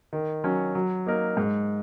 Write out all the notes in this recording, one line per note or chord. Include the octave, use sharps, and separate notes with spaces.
D#3
F#3 C#4
F#3
A#3 D#4 A#4
G#2